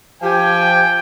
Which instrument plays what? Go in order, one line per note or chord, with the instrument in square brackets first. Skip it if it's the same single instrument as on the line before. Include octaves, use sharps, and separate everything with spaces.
[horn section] F3 G4 G#5 [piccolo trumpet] G5